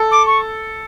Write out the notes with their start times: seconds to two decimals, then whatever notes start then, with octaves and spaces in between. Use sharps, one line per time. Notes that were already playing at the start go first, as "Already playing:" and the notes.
Already playing: A4
0.11 D6
0.26 C#6